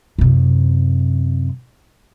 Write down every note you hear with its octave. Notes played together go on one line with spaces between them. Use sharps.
F#2 C3